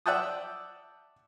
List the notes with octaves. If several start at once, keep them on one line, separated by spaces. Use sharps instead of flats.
D5 E5 F#5 G5 A5 D#6